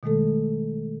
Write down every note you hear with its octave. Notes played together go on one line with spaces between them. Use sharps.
B2 D#3 G#3 A3 A4